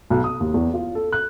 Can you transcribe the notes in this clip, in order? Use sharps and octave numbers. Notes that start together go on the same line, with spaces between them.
B1
D#6
D#2
E2
F4
A4
F#6